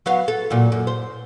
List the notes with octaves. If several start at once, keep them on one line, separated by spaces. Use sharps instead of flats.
F#3 B3 F5
A4
A#2 F#3
F#2
C5